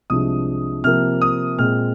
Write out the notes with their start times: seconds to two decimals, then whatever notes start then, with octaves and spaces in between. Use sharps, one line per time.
0.10 C2 C3 F3 G#3 D4 D#6
0.84 C3 F3 A#3 F6
1.22 D#6
1.59 A#2 G#3 C4 F6